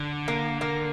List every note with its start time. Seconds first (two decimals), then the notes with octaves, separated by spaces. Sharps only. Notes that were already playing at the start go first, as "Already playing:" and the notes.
Already playing: D3
0.28 A#3
0.61 A#3